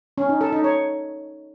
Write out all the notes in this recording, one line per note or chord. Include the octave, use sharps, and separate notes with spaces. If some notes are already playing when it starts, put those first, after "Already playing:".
C#4
D#4
A4
D#4
C#5